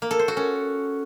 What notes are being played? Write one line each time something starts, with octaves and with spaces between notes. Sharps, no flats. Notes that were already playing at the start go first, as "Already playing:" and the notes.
A#3
A4
C5
F#4
C#4